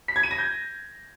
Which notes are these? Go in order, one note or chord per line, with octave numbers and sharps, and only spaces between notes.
B6
G#6
D#7
A#6
G6